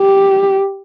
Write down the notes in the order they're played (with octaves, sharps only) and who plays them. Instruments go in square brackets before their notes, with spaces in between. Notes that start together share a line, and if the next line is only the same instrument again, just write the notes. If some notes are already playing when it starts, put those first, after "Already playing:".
Already playing: [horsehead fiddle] G4